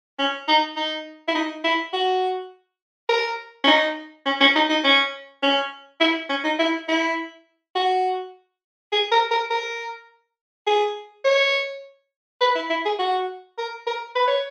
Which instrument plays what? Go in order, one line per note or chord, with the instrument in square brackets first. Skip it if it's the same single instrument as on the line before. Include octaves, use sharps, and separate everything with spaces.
[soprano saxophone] C#4
D#4
D#4
E4
D#4
E4
F#4
A#4
C#4
D#4
C#4
C#4
D#4
D#4
C#4
C#4
E4
C#4
D#4
E4
E4
F#4
G#4
A#4
A#4
A#4
G#4
C#5
B4
E4
E4
G#4
F#4
A#4
A#4
B4
C#5